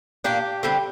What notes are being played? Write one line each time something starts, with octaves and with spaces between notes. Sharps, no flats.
A#2 A#3 D4 G4
D3 G3 C4